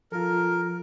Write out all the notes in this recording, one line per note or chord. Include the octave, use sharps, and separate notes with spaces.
F3 F4 A4 A#4